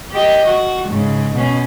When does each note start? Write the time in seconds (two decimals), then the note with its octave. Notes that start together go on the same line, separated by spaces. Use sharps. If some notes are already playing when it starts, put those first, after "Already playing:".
0.12 G4 D#5
0.46 F#4
0.88 G#2 C#3
1.34 B2 C#4